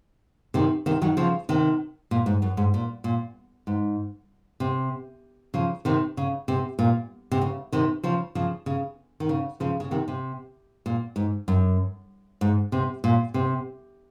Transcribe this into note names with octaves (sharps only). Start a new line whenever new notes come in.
C3 D#3
C3 D#3
D#3 F#3
C#3 F3
C3 D#3
A#2
G#2
F#2
G#2
A#2
A#2
G#2
C3
C#3 F3
C3 D#3
C#3
C3
A#2
C3
C#3
C3 D#3
C#3 F3
C#3 F3
C#3
D#3
C#3
C#3 F3
C#3
C3 D#3
C3
A#2
G#2
F#2
G#2
C3
A#2
C3